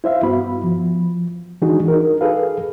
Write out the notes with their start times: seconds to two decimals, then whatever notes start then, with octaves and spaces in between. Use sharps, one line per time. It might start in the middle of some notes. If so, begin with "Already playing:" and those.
0.04 E4 C5 E5 F5
0.23 G2 B3 F#4 B5
0.64 F3
1.62 E3 G#3 D4 D#4 F#4 G#4
1.88 D#4 F#4 A#4
2.21 G#4 A4 B4 F5